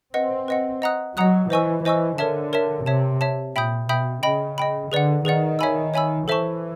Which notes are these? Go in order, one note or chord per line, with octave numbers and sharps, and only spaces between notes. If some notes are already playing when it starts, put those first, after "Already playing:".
C4 B4 D#5 F#5
B4 D#5 F#5
D#5 F#5 A#5 D#6 F#6
F#3 D#5 F#5 A#5 D#6 F#6
E3 C5 D#5 G#5 C#6 E6
E3 C5 D#5 G#5 C#6 E6
D3 A#4 C#5 E5 A5
A#4 C#5 E5 A5
C3 C#5 E5 A5
C#5 E5 A5
A#2 E5 G5 B5 D#6 G6
B2 E5 G5 B5 D#6 G6
C#3 D#5 G5 B5
D#5 G5 B5
D3 G#4 B4 D5 F#5
D#3 G#4 B4 D5 F#5
C#5 E5 G#5 B5 E6
C#5 E5 G#5 B5 E6
E3 A4 C5 E5 A5 C#6